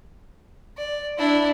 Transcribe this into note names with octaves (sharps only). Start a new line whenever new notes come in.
D5
D4 E4